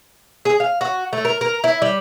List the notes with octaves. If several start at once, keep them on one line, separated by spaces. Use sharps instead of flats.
G#4
F5
F#4
A3
A#4
A#4
E4
G3